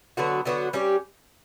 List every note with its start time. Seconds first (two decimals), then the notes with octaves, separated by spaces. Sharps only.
0.17 D3 F#3 B3 F#4
0.45 D3 F#3 B3 F#4
0.73 G3 C#4 G4